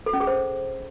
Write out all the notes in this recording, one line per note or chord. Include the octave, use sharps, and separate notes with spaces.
A4
C#4
G#4
C5